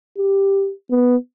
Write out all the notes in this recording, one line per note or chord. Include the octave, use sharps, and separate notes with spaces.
G4
B3